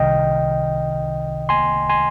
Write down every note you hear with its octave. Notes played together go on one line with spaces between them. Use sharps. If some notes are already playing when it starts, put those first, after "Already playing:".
Already playing: C2 C3 D#3 D#5 G5
G#5 C6
G#5 C6